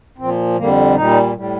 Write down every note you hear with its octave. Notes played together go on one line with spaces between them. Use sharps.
A#2 F3 C4
F2 D3 G3 A#3
A#2 G3 D#4
A2 G3